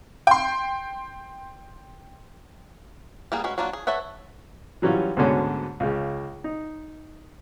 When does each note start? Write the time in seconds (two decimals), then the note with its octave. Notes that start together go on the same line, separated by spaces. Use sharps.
0.27 G5 C6
3.32 G3 A#3 B3 G#4
3.44 G#3 C#4 F#4 B4
3.58 F#3 A#3 D4 F4 F#4
3.73 G#4
3.87 A4 B4 C#5 E5 F#5
4.82 E3 F#3 G3 C#4 F4
5.17 D2 G#2 B2 D3 C#4
5.80 C#2 C#3
6.44 D#4